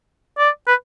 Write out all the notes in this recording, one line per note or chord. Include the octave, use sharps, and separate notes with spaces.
D5
B4